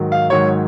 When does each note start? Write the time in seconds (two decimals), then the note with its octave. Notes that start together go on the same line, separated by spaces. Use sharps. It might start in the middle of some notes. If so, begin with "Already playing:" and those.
Already playing: G#2 D#3 F#3
0.12 F5
0.30 G#2 D#3 F#3 C#5